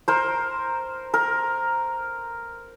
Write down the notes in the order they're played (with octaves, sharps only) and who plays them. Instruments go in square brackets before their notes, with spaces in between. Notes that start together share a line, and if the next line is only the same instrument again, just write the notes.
[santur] A#4 C5
A#4